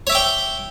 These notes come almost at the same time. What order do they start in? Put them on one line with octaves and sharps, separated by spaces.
C#5 E5 D6 G5